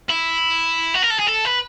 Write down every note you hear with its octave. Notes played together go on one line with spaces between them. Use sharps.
E4
F#4
A#4
A4
G#4
A4
B4